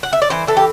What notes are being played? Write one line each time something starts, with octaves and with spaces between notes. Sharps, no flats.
F#5
E5
D5
E3 C5
E3 A4
G4